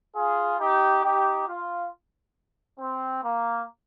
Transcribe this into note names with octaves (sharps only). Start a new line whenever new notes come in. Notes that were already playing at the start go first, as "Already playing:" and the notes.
F4 G#4
D#4 G4
D#4 G4
F4
C4
A#3